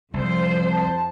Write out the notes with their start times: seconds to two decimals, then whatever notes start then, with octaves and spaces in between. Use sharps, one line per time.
0.14 C2 F2 C5
0.71 A5